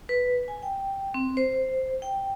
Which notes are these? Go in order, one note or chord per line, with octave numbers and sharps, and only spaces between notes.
B4
G#5
G5
C4
C5
G5